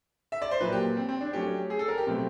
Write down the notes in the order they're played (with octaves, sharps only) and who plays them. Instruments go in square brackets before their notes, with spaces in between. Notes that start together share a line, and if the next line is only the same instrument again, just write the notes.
[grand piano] E5
D5
C5
[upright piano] A#2 F#3 A#3 [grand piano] B4
[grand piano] G4
C4
C4
D4
[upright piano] F#3 A3 C#4 [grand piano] G4
[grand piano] G#4
A4
A#4
G4
[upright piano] B2 F#3 A3 C4